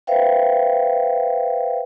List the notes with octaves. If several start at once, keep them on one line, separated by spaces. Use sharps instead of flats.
B4 C5 E5 F5 G5